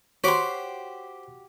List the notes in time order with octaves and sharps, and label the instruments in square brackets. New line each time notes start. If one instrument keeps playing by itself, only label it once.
[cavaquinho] F#4 G4 C6 [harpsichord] C5 B5 D6 [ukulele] C#5